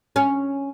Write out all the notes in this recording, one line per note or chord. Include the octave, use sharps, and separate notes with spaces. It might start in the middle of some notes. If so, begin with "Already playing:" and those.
C#4